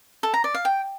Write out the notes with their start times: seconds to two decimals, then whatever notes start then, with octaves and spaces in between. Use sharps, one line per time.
0.23 A4
0.34 A#5
0.44 D5
0.54 F5
0.65 G5